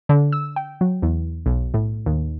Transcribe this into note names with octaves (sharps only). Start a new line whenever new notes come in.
D3
E6
G5
F#3
E2
B1
A2
D#2